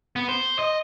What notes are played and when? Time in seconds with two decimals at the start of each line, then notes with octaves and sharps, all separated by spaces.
0.16 B3
0.29 C5
0.59 D#5